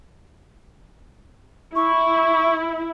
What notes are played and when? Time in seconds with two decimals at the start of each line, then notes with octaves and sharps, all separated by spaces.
1.75 E4 C#6